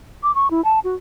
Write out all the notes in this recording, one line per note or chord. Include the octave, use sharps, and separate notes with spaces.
D6
C#6
E4
A5
F#4